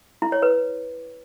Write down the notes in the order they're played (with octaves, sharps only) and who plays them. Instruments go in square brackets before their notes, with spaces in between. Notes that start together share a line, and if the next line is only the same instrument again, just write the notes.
[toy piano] E4
C#5
B4